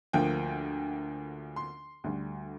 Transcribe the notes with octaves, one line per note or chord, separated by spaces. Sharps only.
D2 D3 F3 A#3 G5
C6
D2 D3 G3